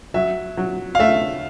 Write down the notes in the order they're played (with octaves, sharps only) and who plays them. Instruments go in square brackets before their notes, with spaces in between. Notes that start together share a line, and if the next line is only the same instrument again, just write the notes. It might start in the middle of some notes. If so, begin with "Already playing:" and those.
[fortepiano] F#3 [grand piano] E5
[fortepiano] F#3
[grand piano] F5
[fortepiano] A3 [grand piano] E5